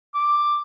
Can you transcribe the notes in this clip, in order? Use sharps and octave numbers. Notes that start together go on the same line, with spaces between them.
D6